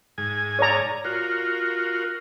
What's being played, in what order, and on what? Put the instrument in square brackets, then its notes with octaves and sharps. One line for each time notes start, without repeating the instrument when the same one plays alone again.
[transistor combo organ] G#2 G#5
[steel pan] C#5 D5 A#5
[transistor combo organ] F4 F#4 A#4